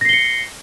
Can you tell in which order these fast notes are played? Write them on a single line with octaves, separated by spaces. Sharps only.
A#6 C7 G7 C#7